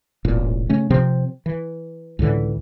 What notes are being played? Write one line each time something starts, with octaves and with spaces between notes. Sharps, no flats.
E1 A1 A#2
C#3 A3 C#4
C3 F3 C4
E3
C#2 A2 D3 E3